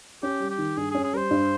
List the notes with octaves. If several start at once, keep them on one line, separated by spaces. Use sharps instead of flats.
C#4 G4
G3
G4
D#3
G2 G#4
C#4 G#4
G#4
G3 A#4 C5
G2